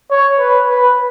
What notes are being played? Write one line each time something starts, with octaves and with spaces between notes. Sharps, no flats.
C#5
B4
B4